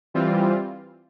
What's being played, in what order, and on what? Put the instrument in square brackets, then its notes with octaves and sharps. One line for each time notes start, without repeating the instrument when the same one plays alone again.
[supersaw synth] E3 G3 C4 F4